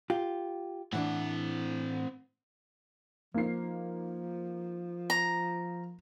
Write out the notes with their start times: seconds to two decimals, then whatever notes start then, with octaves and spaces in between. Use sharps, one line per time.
0.10 F4 G4
0.93 A2 E3 C4 D4 F#5
3.34 F3 A#3 D#4 C7
5.10 A#5